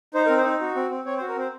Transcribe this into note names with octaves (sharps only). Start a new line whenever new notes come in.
D#4 C5
A#4
C4
C5
D#4
F#4
C4
C4
C4 C#5
C5
F#4
A#4
C4 C5